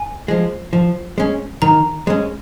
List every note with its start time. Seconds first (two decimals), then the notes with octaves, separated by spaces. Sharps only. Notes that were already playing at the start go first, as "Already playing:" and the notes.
Already playing: G#5
0.28 F3 G#3
0.73 F3
1.18 G#3 C#4
1.62 D#3 A#5
2.07 G#3 C#4